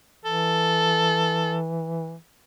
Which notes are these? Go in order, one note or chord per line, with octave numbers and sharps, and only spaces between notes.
E3 A4